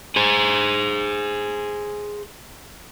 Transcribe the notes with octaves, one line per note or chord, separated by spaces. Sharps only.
G#4 C5